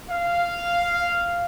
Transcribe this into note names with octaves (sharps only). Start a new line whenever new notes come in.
F5